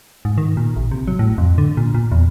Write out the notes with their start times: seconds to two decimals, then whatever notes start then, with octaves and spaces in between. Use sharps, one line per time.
0.25 G#2
0.38 D#3
0.57 A#2
0.76 A1
0.91 C3
1.08 F#3
1.19 A2
1.38 F2
1.58 D3
1.77 A#2
1.94 A#2
2.12 E2